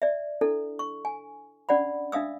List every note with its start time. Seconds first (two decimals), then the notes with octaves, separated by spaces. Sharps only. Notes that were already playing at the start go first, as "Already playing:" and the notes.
0.02 D5 E5
0.41 D4 E4 A4
0.79 C#6
1.05 G#5
1.69 C#4 D4 D5 F#5 B5
2.12 D4 E5 F5 D#6 E6